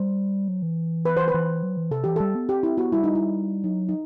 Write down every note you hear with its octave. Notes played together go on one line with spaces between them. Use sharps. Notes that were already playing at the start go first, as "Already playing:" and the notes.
Already playing: G3 C5
F#3
E3
B4
C5
B4
E3
F#3
E3
C3 A4
E3 G4
G3 A4
B3
C4 G4
E4
B3 F#4
G3 E4
D#4
E4
F#3 D#4
D#4